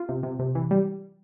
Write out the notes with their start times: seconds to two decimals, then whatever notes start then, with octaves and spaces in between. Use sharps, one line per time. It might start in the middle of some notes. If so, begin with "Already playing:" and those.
Already playing: F4
0.09 C3
0.23 C3
0.39 C3
0.55 E3
0.71 G3